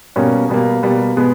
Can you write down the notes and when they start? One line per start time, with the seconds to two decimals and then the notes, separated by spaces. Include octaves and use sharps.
0.16 B2 G3 A#3 C#4
0.49 B2 G3 A#3
0.83 B2 G3 A#3
1.17 B2 G#3 B3